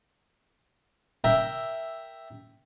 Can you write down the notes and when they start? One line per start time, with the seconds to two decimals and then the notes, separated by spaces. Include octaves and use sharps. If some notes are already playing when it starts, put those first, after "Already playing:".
1.24 A#4 E5 G5